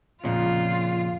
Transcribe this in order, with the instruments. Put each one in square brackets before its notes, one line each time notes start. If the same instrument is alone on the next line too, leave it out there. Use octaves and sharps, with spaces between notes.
[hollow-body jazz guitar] F2 A#2 C#3 [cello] F4